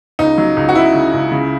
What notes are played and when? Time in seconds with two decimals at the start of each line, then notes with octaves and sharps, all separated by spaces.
0.19 C#2 D#4
0.38 F#3
0.57 C#2
0.69 F#4
0.75 C#2 E4
0.95 C#3
1.14 C#2
1.32 C#3